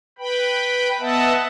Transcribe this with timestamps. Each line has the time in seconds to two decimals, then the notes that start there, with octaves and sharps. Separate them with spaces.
0.19 B4 G5 B5
1.00 B3 D#5 E5 F#5 A5